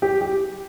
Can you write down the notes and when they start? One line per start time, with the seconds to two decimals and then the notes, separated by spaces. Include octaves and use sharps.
0.02 G4
0.21 G4